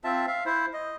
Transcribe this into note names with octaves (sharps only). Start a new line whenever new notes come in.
C4 F4 E5 A5
E5 F5
E4 C5
D#5